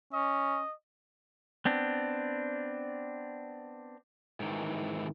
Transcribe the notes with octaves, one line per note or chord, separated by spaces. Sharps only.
C#4 D#5
B3 C4 D4
G#2 D#3 E3